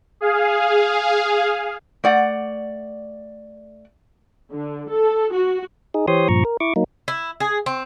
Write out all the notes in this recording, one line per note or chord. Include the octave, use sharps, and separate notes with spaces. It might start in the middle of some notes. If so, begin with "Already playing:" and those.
G#4 F5
A3 D5 F#5
D3
A4
F#4
D#4 G#4
E3 G4 C5 C#5 C6 D#6
G2 A#2 F3 A#5 C#6
A#4
E4 C#6 D6
F#3 A#3 D#4
E4
G#4
C4